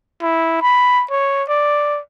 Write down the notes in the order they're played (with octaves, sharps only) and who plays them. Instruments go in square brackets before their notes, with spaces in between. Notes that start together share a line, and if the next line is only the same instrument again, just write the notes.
[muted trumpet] E4
B5
C#5
D5